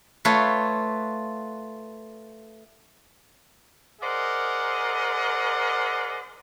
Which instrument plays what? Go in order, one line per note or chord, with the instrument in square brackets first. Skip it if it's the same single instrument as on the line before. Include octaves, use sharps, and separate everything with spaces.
[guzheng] A3 F4 B4 C#5
[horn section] G#4 A#4 C5 D5 D#5 F#5